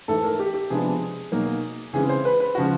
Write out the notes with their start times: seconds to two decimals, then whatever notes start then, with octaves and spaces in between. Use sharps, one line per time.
0.08 G#2 E3 A3 A4
0.24 A#4
0.39 G4
0.54 G4
0.70 C3 F3 G#3 B3 D4 G#4
1.31 B2 F#3 A#3 D#4
1.93 C#3 E3 G#3 C4 G#4
2.09 C5
2.25 B4
2.40 B4
2.55 C#3 F3 G#3 F#4